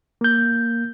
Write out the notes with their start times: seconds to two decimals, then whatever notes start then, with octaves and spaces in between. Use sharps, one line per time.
0.21 A#3 G6